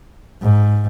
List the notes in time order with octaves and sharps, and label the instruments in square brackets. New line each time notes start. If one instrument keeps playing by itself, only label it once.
[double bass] G#2